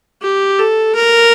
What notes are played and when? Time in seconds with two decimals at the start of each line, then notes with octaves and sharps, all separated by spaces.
0.22 G4
0.59 A4
0.95 A#4